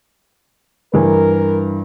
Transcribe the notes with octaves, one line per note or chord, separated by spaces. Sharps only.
G2 E3 A#4